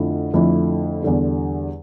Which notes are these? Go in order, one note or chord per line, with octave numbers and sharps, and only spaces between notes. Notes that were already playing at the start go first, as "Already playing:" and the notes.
Already playing: F2 D3 F3 A3 E4
F2 D3 F3 A3 E4
E2 D3 G3